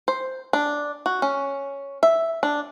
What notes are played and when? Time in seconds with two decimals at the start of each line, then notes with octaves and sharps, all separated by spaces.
0.08 C5
0.53 D4
1.06 F#4
1.22 C#4
2.03 E5
2.43 D4